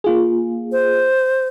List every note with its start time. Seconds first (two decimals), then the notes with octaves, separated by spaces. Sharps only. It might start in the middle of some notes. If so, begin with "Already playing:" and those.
0.04 A#3 F4 G#4
0.72 C5